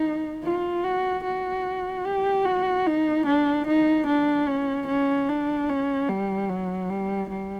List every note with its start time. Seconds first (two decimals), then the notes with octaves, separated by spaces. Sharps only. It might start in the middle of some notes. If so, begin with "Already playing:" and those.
Already playing: D#4
0.44 F4
0.84 F#4
1.24 F#4
2.05 G4
2.45 F#4
2.86 D#4
3.26 D4
3.67 D#4
4.06 D4
4.48 C#4
4.87 C#4
5.29 D4
5.69 C#4
6.08 G3
6.49 F#3
6.89 G3
7.30 G3